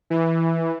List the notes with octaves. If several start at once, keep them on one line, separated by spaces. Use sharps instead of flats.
E3